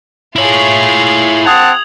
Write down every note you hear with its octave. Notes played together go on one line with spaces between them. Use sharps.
E4 F4 G#4 C#5 F#7
C4 F#5 A5 D#6 G#6 F7